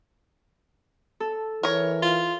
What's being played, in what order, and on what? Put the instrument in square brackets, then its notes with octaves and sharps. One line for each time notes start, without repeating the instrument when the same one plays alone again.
[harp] A4
[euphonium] E3 [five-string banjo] A#4 C#5
[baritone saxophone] F4